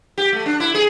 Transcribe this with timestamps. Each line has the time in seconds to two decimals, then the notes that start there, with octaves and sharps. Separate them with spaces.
0.18 G4
0.33 A3
0.46 D4
0.60 E4
0.74 G#4